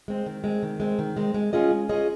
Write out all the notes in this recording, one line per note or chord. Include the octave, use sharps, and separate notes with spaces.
G#3 C4
D#3
G#3 C4
D#3
G#3 C4
D#3
G#3 C4
G#3
C#4 F4 G#4 D#5
G#3
C#4 F4 G#4 D#5